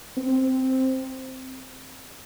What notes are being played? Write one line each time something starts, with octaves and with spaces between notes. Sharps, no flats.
C4